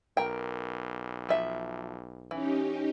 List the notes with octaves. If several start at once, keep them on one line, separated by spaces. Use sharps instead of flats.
B1 A#4 G5
F3 E5
E3 C#4 D#4 G4